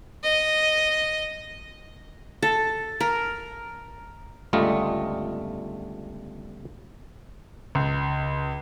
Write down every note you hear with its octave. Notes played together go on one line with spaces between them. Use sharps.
D#5
A4
A#4
G1 C#2 G3 A3 F4 D#5
C#2